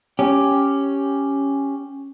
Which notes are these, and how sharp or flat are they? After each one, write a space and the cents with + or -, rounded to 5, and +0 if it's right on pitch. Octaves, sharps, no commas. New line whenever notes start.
C#4 +0 G4 +0